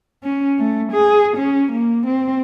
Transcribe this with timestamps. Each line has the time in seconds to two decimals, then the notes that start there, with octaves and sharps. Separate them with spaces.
0.23 C#4
0.59 A3
0.92 G#4
1.37 C#4
1.72 A#3
2.06 C4